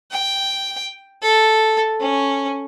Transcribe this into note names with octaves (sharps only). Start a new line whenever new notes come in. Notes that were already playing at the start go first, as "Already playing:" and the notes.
G5
A4
C#4